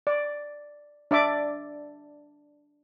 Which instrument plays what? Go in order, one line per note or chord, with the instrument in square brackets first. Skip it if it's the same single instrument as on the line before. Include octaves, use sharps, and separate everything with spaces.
[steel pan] D5
D4 D5 E5 D6